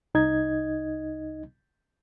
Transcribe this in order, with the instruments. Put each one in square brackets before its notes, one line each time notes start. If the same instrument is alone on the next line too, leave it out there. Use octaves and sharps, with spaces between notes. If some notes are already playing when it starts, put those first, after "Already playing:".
[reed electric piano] C2 D#4 D#5 G#6